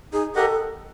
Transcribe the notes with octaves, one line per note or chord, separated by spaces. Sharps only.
D#4 G#4
G4 A4 A#4 D#5 F#5